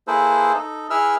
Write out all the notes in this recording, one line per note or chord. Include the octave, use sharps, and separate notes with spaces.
A#3 E4 G#4 A4 B4 C5
D#4 A4
E4 G#4 B4 E5 E6 F6